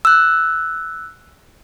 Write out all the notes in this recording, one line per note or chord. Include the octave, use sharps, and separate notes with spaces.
E6 F#6